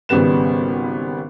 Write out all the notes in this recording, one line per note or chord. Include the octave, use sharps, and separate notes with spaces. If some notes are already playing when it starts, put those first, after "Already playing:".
G#1 C#3 G3 B3 E7